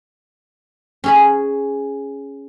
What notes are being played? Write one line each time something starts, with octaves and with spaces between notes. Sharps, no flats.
C#4 G#4 B5